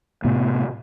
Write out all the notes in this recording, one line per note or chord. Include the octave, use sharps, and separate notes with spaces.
A2 C3 A3 B3